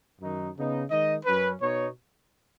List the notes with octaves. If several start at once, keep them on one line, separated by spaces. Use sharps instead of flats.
F#2 D#3 F#3 D#4
C#3 B3 D#4
D#3 G#3 D#4 D#5
F#2 F#3 C#4 B4
B2 B3 D#4 C#5